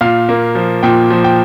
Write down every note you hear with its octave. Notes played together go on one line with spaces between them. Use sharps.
A#2 F5
A#3
F3
A#2 G5
F3
G5